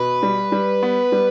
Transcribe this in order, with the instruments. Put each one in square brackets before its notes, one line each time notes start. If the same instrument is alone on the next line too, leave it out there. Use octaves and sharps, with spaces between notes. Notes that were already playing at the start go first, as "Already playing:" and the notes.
Already playing: [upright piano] B2 [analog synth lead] B4
[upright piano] G3
G3
B3
G3